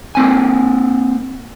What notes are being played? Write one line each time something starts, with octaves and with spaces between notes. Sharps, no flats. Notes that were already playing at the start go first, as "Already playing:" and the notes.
A#3 C4 G#5